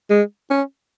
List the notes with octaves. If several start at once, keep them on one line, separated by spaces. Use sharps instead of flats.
G#3
C#4